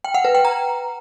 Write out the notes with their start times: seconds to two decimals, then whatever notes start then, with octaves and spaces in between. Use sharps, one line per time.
0.04 G5
0.15 F#5
0.25 B4
0.35 G5
0.45 A#5